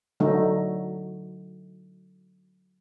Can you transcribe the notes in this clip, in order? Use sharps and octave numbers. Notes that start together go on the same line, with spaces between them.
D3 F#3 A3 D#4